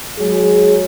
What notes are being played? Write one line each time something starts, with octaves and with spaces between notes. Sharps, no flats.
F#3 G#3 G#4